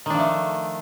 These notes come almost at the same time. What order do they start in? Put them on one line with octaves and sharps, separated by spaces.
D#3 D4 F3 A3